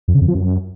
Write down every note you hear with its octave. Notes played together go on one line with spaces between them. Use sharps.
F2
C#3
F2
F3
F#2